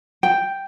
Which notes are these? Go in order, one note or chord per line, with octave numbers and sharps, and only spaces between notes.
G5